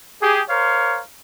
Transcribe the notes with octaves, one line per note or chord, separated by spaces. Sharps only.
G4 G#4
A#4 C5 C#5 F5